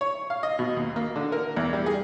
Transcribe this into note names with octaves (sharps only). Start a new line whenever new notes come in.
C#5
F5
D#5
B2
D#2
A#3
D3
A#4
E2
G3
G#4